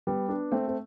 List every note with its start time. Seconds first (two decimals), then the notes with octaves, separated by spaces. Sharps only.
0.07 G3 B3
0.29 B3 D4
0.52 A3 C4
0.68 C4